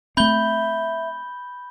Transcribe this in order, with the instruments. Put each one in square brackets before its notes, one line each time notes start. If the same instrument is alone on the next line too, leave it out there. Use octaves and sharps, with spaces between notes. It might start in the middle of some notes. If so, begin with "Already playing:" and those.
[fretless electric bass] A3 C4 [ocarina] E5 [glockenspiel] B5 G6 G7